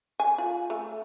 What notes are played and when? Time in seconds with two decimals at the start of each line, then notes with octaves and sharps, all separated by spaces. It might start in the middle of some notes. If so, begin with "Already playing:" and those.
0.20 G#5
0.38 F4
0.70 A3